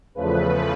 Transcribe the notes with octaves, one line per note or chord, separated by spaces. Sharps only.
E2 C#3 F3 A3 B4